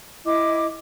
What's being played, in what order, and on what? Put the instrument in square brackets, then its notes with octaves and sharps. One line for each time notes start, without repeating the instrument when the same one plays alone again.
[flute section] E4 D#5 D6